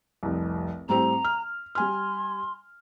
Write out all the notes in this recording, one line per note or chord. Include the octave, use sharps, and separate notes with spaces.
F1 C2
A2 G3 C4 A#5
F6
G3 G#5 C6 F6